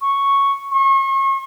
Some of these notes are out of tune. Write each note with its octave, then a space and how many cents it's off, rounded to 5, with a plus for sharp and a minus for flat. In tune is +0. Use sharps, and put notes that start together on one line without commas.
C#6 +0
C#6 -35